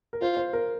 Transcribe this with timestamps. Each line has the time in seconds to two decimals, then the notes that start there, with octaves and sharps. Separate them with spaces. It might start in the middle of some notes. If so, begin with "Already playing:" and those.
0.13 A#4
0.21 F4 C5
0.37 C5
0.53 A#4